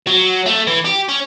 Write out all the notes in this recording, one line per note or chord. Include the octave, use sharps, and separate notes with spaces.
F#3
A3
E3
G4
C#4